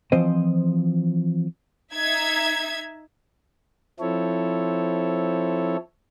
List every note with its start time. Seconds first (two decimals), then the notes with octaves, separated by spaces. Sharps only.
0.12 E3 F3 C4 C5 D#5
1.95 D#4 E5 G#6
4.00 F3 C4 E4 A4 C#5